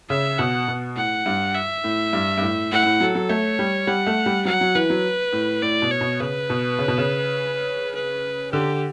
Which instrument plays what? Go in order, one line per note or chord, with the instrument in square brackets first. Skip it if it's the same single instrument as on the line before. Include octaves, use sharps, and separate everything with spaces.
[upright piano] C#3 [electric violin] E5
[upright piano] B2 [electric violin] F#5
[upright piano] B2
[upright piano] A2 [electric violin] F#5
[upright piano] G2
[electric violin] E5
[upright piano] A2
G2
G2
A2
[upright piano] A2 [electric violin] F#5
[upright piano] A2
[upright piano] F#3 [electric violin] A4
[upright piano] F#3
[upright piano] A3 [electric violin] C#5
[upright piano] G3
[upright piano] G3 [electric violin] F#5
[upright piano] A3
G3
[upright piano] F#3 [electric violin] F#5
[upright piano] F#3
[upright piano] E3 [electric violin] B4
[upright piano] F#3
A2
[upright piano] A2 [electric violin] D5
[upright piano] B2
[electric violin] C#5
[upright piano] B2
[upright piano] C#3 [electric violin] B4
[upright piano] B2
C#3
B2
C#3
[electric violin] B4
[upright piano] D3 [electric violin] G4